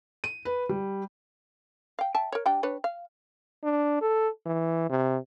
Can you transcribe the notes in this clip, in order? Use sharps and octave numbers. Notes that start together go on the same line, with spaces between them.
D#7
B4
G3
F5 G5
E5 G5 A5
A#4 C#5
G3 D4 G5
D4 B4 C#5
F5
D4
A4
E3
C3